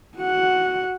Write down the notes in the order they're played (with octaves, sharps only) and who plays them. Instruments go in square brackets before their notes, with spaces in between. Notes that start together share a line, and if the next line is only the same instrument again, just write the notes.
[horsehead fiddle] F#4 F#5